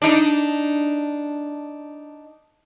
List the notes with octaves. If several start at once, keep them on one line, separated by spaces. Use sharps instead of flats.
D4 D#4